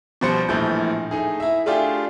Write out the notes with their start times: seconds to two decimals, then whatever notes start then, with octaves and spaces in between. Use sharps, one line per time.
0.21 B2 F3 G3 C5 C#7
0.49 A#1 A2 E3 F3 G6
1.11 A3 D#4 G#4
1.40 E4 E5
1.66 A3 D4 F4 G4 G#4